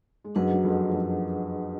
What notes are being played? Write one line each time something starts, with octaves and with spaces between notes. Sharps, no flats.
G#3
F#2 F#3 D4 G#4 B4 D#5 F#5
F#3
F2 F3
F3
F#2 F#3